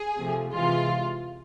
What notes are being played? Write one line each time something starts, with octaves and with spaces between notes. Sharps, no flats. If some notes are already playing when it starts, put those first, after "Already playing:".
Already playing: G#4
C3 F3 A3
C3 E3 G#3 F4